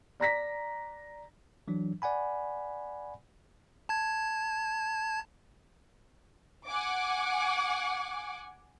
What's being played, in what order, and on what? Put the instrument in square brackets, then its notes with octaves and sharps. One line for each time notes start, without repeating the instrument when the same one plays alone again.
[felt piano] D5 A#5 A#6 B6
[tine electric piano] E3 F#3 D4
D5 F#5 G#5 B5
[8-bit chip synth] A5 G#6
[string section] F#5 G#5 D6